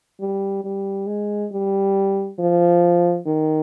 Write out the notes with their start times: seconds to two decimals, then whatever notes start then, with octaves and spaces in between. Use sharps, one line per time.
0.20 G3
0.64 G3
1.07 G#3
1.52 G3
2.39 F3
3.27 D#3